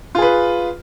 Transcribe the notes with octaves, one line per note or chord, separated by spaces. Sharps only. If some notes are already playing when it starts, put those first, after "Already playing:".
F4 G#4 B4